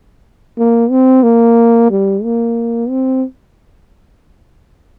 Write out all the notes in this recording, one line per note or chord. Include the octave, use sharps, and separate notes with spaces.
A#3
C4
A#3
G3
A#3
C4